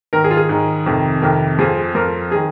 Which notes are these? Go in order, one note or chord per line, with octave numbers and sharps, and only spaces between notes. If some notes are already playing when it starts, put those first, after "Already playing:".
G#2 D#3 A#4
G#4
F4
G#4
G#2 D#3
F2 C3 D#3
F2 C3 D#3 A#4
F2 F3 G#4
F2 F3 A#4
D#3 G#4